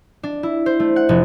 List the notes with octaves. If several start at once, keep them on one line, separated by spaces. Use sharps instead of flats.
D4
E4
C5
A3
F#5
F1